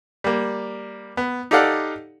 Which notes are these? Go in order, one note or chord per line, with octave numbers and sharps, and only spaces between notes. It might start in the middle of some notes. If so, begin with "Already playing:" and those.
G3 A#3
B3
D#4 G4 A4 D5 F5 F#5